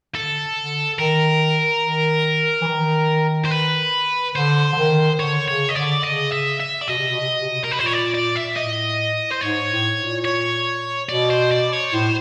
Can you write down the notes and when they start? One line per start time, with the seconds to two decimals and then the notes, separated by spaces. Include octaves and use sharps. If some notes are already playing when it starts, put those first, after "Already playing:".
0.15 D3 A4
0.57 D3
0.99 D#3 A#4
1.84 D#3
2.61 E3
2.67 D#3
3.45 C5
3.52 B4
4.36 D3 C5
4.73 D3
4.78 D#3
5.20 D3 C#5
5.48 C#3 C#5
5.69 D#5
5.76 D3 D5
6.04 C#3 D#5
6.32 E5
6.60 E5
6.82 D5
6.88 B2 D#5
6.98 C3
7.09 B2
7.20 C3
7.29 B2
7.40 C3
7.50 B2
7.64 A#4
7.71 A#2 B4
7.79 C5
7.86 C#5
7.93 D5
8.15 D5
8.36 E5
8.56 A2 D#5
9.32 C5
9.41 G#2 C#5
9.69 A2
9.96 A#2
10.25 C#5
11.09 B2 D5
11.30 C5
11.51 D5
11.73 C#5
11.93 A2 C5